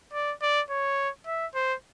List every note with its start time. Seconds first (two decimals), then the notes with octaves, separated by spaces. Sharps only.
0.14 D5
0.42 D5
0.70 C#5
1.27 E5
1.55 C5